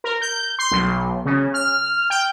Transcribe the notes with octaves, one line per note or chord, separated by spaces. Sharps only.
A#4
G6
C6
B1
C#3
F6
G5